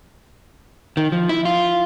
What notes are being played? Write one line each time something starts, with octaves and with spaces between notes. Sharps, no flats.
D#3
F3
E4
F4